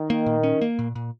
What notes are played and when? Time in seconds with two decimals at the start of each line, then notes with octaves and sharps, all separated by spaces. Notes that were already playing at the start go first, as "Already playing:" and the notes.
Already playing: D#3
0.10 A#3
0.26 A#2
0.43 C#4
0.62 A#3
0.79 A#2
0.95 A#2